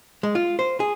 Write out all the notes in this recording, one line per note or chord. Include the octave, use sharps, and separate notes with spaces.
G#3
F4
C5
G#4